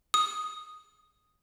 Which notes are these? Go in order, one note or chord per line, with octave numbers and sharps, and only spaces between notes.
D#6